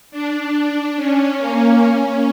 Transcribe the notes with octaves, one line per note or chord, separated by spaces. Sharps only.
D4
C#4
A#3
C#4